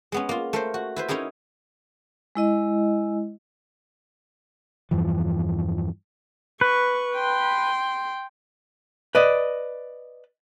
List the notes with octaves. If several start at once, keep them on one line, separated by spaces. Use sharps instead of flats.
G#3 B3 C#4
A#3 F4
A3 A#4 C5
F#4
E4 B4 C5
C#4 D#4 E4 G#4 A#4
G#3 E4 D#5
E2 G2 E3 F3
B4 C#6
G5 C6
B4 D5 D#5